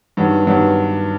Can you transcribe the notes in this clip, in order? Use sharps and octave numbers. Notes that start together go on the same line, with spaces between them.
G2 D#3 F#3 B3
G2 D#3 F#3 B3